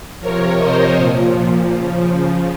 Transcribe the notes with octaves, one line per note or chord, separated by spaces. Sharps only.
C3 F3 A#4 C#5
C5 D#5
A#2 F3
C#3 F3